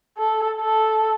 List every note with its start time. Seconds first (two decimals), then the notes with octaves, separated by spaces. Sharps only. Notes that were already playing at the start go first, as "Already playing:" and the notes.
0.18 A4
0.61 A4